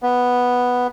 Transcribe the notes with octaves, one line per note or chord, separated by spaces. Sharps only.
B3